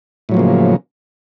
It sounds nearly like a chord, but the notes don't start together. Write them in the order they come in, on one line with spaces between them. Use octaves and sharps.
A2 F#3 F3 A#3 C#3